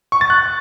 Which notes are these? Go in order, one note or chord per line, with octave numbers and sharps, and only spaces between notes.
C#6
A6
F#6